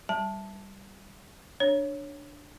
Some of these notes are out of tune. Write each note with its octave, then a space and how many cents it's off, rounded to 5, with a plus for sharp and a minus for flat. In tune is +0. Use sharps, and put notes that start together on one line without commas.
G3 +0 A5 +0
D4 +0 C#5 +0